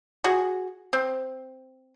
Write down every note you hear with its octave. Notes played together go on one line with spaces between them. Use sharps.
F#4 G#4
C4